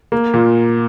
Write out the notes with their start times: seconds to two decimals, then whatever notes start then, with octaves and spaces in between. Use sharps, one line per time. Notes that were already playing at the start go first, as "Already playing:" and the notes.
0.12 A#3
0.34 A#2